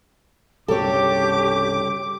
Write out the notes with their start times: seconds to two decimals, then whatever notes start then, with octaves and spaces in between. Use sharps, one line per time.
0.68 C2 G2 C#3 G4 A4 C#5 D6